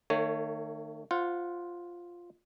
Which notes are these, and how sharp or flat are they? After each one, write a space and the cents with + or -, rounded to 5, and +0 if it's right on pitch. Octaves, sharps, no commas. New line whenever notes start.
D#3 -30 A3 +35 C#5 +0
F4 +0 C5 +0 F#5 -15